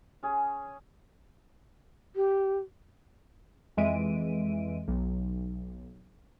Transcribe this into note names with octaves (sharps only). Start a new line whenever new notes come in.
C#4 G#4
G4
F2 E3 G#3 E5 D7 D#7
B1